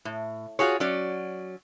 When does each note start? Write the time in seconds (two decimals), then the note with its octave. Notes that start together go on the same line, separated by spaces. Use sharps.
0.05 A2
0.59 F4 F#4 G#4 C#5
0.80 F#3 C#4 D5